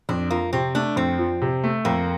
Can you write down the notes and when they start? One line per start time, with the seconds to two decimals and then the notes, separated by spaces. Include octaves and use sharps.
0.09 F2 D4
0.30 F3 A#3
0.53 C3 C4
0.75 A3 D4
0.96 F2 C4
1.18 F3
1.42 C3
1.64 A3
1.85 F2 A#3